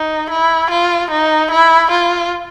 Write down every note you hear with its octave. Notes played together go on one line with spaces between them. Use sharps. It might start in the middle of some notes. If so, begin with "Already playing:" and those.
Already playing: D#4
E4
F4
D#4
E4
F4